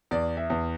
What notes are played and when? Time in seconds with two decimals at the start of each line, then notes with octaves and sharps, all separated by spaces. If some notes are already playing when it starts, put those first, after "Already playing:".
0.11 E2 D5
0.37 E5
0.50 E2